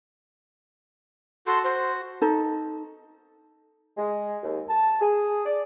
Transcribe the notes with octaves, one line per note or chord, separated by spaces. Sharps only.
F#4 A4 C6
F#4 C5
D#4 A4
G#3
D#2
A5
G#4
D5